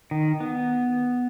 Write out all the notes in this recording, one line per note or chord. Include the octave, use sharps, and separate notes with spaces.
D#3
B3